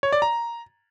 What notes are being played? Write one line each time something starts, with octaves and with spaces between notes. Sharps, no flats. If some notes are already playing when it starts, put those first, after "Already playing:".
C#5
D5
A#5